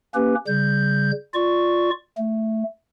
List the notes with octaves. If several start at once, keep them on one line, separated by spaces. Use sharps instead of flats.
A#3 C#4 G4 B4
C#3 G3 G6
F4 D5 C#6
A3